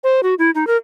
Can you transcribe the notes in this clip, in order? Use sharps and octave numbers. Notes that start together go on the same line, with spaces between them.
C5
F#4
E4
D#4
A#4